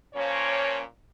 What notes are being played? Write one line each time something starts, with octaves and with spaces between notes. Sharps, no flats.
A#2 F3 A#3 C#4 C#5